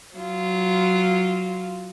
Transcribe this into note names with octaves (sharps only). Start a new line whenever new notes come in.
F#3 F4